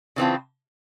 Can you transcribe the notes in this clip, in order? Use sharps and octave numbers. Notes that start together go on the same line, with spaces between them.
C#3 E3 A3 C4 F4